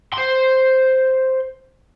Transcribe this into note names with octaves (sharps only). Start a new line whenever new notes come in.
C5 C6